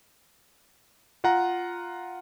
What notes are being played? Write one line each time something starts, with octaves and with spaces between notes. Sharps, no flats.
F4 F#5 A#5